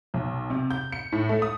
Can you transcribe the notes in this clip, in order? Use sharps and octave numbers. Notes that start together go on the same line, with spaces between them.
B1
C3
G6
C#7
A2
A3
D#6